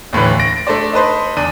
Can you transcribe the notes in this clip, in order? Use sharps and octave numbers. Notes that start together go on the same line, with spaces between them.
D#2 A2 D3 E3
A#6 D7
A3 D4 C5 D5
D#4 A4 B4 C5
E2 D4 D#7